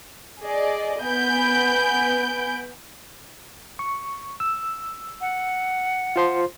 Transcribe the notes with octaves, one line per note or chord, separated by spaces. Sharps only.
G#4 D5 D#5
B3 G#5 B5 G6 D7
C#6
E6
F#5
F4 C5 C6